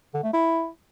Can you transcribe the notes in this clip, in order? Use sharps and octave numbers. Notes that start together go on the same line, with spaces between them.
D3
A3
E4